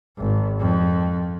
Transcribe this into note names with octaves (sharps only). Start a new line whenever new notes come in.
G#1
F2